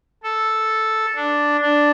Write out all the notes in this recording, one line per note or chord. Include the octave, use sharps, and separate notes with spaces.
A4
D4
D4